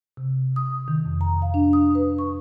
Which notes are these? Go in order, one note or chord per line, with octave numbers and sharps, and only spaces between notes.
C3
D#6
D#3
F2
A#5
F5
D4
D#6
B4
C#6